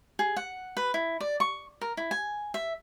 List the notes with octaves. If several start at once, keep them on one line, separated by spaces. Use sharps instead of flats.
G#4
F#5
B4
E4
D5
C#6
A#4
E4
G#5
E5